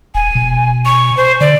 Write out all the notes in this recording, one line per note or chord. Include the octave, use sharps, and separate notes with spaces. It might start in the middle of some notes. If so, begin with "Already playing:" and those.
E1 G#5
B2
C#6
C5
D3 D5